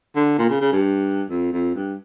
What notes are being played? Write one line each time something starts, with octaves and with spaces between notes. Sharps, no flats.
D3
A#2
C#3
C#3
G2
F2
F2
G2